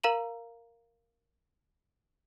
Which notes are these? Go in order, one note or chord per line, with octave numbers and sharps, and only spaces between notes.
A#4 F5 A#5 D#7 F#7